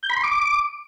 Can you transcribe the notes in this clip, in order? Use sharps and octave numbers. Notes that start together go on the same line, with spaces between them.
G6
B5
C6
D6